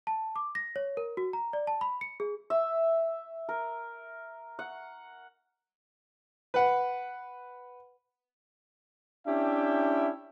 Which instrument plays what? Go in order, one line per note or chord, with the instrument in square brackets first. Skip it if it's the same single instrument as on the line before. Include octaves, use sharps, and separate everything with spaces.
[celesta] A5
D6
A#6
C#5
A#4
F#4
A#5
D5
A5
B5
C#7
G#4
[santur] E5
A#4
F#5
[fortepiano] B4 F#5
[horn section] C#4 D4 E4 G4 E5 G5